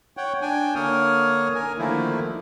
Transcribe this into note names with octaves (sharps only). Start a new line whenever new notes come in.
C#5 F#5 G5
D4 G5 G#5
D3 A#3 C#5 D#6 F6
A#4 G#5
D3 D#3 F3 A3 A#3 E4